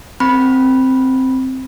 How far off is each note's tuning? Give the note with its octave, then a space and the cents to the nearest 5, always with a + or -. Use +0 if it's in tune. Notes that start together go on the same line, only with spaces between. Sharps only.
C4 +0 B5 -10